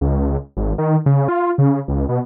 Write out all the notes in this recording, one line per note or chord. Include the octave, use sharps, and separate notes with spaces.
C#2
G#1
D#3
C#3
F4
C#3
C#2
B2